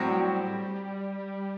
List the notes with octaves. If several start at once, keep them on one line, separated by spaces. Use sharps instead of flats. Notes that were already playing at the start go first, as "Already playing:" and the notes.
Already playing: A2 F#3 G3 C4 F#4